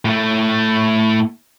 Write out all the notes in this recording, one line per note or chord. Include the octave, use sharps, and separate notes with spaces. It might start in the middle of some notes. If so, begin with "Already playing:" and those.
A2 A3